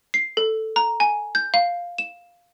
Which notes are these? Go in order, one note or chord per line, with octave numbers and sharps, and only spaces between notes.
C7
A4
A#5
G#5
G6
F5
E7